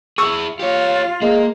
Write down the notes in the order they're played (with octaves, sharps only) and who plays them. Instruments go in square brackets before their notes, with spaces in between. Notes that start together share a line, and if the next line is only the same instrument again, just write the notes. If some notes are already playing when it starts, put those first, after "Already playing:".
[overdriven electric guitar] E4 G#4 [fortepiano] C#6 E6
[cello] F4 [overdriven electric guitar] G4 C#5
[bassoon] G#3 [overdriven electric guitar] A#3